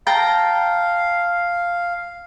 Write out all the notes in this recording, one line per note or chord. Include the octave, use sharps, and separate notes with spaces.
F5 G5 A5 A#5